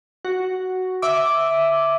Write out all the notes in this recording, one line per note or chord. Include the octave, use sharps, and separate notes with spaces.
F#4
E5 D6